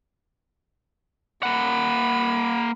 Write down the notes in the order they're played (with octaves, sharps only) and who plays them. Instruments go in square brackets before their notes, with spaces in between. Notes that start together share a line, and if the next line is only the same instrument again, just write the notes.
[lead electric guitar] A#3 F#5 [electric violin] B5